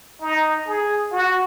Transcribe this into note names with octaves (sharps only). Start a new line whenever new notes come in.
D#4
G#4
F#4